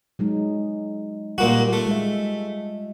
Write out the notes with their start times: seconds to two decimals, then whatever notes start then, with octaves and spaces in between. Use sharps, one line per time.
0.19 F#3 G#3 D#4
1.38 A#2 G3 A#3 F4 F#4
1.73 A3
1.87 G#3 E5